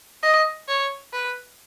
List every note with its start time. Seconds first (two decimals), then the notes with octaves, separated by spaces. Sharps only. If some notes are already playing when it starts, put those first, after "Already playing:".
0.23 D#5
0.68 C#5
1.13 B4